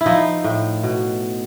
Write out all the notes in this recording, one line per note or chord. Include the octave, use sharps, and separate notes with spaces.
E4
F3 D#4
A2
B2